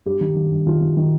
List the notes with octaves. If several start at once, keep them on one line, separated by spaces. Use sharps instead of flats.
G2 G4
D#3
D#3
G2
D#3 F4
D#3
D#3